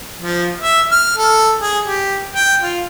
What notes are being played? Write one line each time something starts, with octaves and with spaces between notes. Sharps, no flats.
F3
E5
F6
A4
G#4
G4
G5
F4